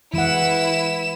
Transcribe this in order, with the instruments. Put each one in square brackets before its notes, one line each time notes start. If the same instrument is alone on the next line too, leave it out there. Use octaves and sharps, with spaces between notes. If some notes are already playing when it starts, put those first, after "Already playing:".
[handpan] E3 G#3 F#5 [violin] E4 E7